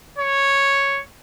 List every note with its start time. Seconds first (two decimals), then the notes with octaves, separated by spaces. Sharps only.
0.18 C#5